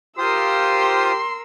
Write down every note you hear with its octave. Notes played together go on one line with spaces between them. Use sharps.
F4 G4 A#4 C5 C6 D#6 E6